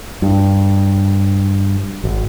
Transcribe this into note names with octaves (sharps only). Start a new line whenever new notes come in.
G2
G#1